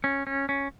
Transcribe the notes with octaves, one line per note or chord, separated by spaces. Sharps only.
C#4
C#4
C#4